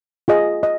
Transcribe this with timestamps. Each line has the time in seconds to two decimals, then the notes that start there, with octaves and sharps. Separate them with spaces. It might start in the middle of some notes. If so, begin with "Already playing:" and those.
0.28 F4 G#4 D#5
0.63 D#5